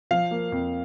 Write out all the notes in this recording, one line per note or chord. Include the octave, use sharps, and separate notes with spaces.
F3 F5
A#3
F2